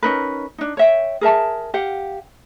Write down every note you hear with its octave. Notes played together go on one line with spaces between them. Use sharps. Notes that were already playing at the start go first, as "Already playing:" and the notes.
C#4 D#4 A#4 B4
D4 D#4
C#5 E5 G5
G#4 A#4 E5 A5
G4 F5 F#5